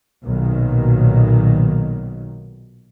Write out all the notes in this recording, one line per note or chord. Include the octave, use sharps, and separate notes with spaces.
B1 A#2 D#3 F#3